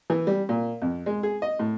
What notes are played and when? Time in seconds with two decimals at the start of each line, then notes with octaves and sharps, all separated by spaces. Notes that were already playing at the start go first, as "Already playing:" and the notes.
0.10 E3
0.27 G3
0.49 A#2
0.82 F2
1.06 G#3
1.23 G#4
1.42 D#5
1.59 A2